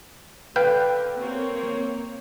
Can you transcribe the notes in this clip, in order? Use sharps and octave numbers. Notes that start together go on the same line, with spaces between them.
D3 B4 F5 G5
A#3 C4 C#5